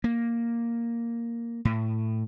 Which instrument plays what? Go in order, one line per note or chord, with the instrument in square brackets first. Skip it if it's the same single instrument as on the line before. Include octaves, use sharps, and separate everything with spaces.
[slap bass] A#3
A2